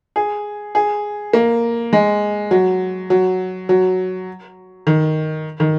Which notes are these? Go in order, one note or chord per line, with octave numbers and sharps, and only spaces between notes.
G#4
G#4
A#3
G#3
F#3
F#3
F#3
D#3
D#3